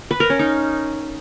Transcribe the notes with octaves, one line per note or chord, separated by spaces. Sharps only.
B4
A#4
C#4
D#4